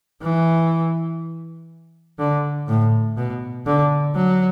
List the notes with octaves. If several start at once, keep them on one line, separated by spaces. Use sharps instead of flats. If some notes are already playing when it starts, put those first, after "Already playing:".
E3
D3
A2
B2
D3
F#3